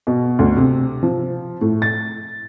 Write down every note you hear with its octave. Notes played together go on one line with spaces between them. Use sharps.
B2
D2
C3
F3
A2
A6